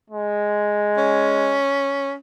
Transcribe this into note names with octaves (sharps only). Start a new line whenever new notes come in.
G#3
C#4